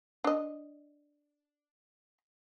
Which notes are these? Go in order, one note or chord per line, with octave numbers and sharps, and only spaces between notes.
D4 D#5